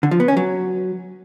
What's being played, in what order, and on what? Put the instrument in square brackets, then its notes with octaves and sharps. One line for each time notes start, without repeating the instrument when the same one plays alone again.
[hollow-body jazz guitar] D3
F3
B3
C#4
F#3